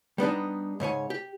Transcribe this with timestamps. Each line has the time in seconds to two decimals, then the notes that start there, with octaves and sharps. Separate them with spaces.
0.18 G3 B3 D4 D#4
0.80 G#2 C#3 C#5 G#5
1.10 G4